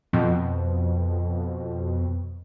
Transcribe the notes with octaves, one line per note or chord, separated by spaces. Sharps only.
F2 B2